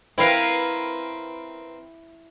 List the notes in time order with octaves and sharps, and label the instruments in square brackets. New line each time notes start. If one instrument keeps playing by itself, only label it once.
[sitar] C4 A#4 B4 [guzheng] E4 F5